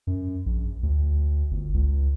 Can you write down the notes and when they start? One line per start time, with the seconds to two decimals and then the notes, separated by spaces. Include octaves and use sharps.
0.07 F#2
0.46 A#1
0.83 D2
1.51 G1
1.74 C#2